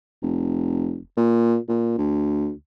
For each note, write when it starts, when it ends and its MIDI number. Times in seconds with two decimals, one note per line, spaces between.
0.22 0.99 29
1.17 1.57 46
1.69 1.95 46
1.98 2.52 38